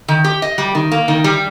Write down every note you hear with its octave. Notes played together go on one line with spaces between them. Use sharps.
D#3
G4
D#5
G3
D#3
A#3
D#3
G3